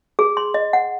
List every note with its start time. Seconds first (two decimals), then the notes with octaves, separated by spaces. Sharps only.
0.19 G#4
0.37 C6
0.54 D#5
0.73 F#5